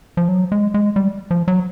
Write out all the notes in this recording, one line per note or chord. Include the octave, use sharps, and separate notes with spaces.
F3
F#3
G#3
G#3
G3
F3
F#3